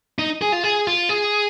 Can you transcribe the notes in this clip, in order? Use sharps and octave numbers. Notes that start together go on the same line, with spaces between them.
D#4
G#4
F4
G#4
F4
G#4